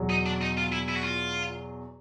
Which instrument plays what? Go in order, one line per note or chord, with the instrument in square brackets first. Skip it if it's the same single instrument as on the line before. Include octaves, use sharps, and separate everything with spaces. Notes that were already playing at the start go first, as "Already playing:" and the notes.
Already playing: [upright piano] E2 B2 F#3
[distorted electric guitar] D#4
D4
D#4
F4
E4
E4
F#4
F4